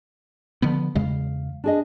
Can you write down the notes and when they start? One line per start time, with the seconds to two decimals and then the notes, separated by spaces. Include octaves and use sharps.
0.62 D3 F3 B3
0.95 E2 C#3 G#3 F5
1.64 D4 G#4 D#5